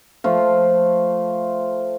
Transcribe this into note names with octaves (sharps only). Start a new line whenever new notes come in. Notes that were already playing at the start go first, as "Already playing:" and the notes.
F3 A3 F4